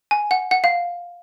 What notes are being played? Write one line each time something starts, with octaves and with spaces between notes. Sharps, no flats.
G#5
F#5
F#5
F5